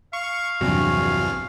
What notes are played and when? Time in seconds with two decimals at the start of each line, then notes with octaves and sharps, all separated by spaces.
0.13 F5 C#6
0.61 A#1 E2 G2 C3 F#3 G#5 C#6